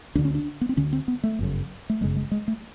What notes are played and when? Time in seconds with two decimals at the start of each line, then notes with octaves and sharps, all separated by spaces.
0.15 D2 D3 D4
0.25 C#4
0.35 D4
0.61 B3
0.69 C4
0.77 D2 D3 C#4
0.93 C4
1.08 B3
1.24 A3
1.39 G1 F#2 C#3
1.90 A3
2.01 G1 F#2 C#3 G#3
2.16 G#3
2.31 G#3
2.48 A3